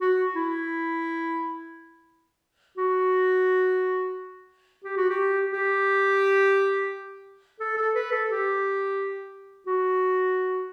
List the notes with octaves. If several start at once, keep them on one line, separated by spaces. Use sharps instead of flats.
F#4
E4
F#4
G4
F#4
G4
G4
A4
A4
B4
A4
G4
F#4